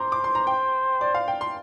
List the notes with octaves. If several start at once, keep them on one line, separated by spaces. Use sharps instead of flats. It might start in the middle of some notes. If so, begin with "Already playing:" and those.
Already playing: C5 A#5 C6 D6
D6
C6
A#5
G5
D5
F5
G5
C6